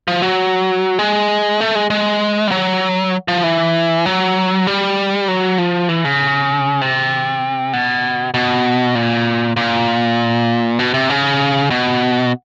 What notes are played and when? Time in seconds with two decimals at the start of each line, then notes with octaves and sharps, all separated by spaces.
0.08 F3
0.22 F#3
0.99 G#3
1.61 A3
1.75 G#3
1.90 G#3
2.48 G3
2.51 F#3
3.28 F3
3.43 E3
4.06 F#3
4.67 G3
5.28 F#3
5.58 F3
5.89 E3
6.05 C#3
6.81 C3
7.73 B2
8.34 B2
8.95 A#2
9.56 A#2
10.79 B2
10.94 C3
11.10 C#3
11.70 B2